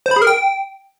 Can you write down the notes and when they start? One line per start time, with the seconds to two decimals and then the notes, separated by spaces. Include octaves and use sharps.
0.06 C5
0.11 B5
0.16 G#4
0.22 A#4
0.27 G5